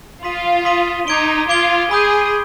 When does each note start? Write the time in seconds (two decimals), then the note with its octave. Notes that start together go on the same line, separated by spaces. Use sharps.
0.23 F4 C6 D#6 B6 D#7 G7
0.65 C6 D#6 B6 D#7 G7
1.07 D#4 D6 G#6 D7 G7
1.49 F4 D6 G#6 D7 G7
1.91 G#4 B5 D#6 G6